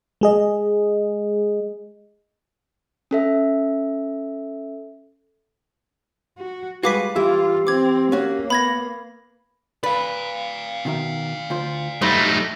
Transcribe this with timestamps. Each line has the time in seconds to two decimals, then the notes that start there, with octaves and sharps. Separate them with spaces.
0.21 G#3 G#4 D#5
3.11 C#4 A4 E5
6.37 F#4
6.83 G3 G#3 F#4 G#4 B4 F5 D6 B6
7.16 E3 E4 F4 G4 E6
7.67 C4 D6 G#6
8.12 A#3 C#4 F#4
8.50 B3 B5 G#6 A#6
9.83 B4 D5 F5
10.85 B2 D#3 E5
11.50 D2 F4 C5
12.02 G2 F#3 G3 A3 D#4 C5